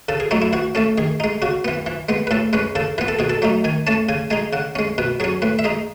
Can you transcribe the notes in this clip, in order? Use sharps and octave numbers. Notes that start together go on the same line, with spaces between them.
C#3 A4
G#4
F#3 A3 D#4 E4
E4
E3 F#4
A3 C#4 A4
D#3 G#4
G#3 D#4
C#3 F#4
E3 B3
E3
G#3 B3
B4
A2 A4
G#3 C#4 B4
C#3 A4
E3 B3 B4
A4
B2 G#4
A4
F#3 A3 D#4
D#3 G#5
A3 C#4 A5
C#3 G#5
G#3 D#4 G#5
C#3 F#5
G#3 C#4
B2 B4
F#3 C#4 G#4
A2 B4
E5
G#3 D#4 D#5